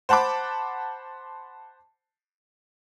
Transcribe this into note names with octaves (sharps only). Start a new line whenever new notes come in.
C5 F#5 A5 B5 D6